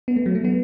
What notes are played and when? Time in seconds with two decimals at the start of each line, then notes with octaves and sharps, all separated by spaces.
0.08 B3
0.16 A3
0.26 F#3
0.35 A3
0.45 B3